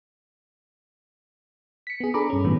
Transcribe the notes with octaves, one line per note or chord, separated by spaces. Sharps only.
B6 C#7
B3 G#4
D4 G#4 A4 A#5 B5 D6
G2 C#4
A2 D#3 F#3 G3 B3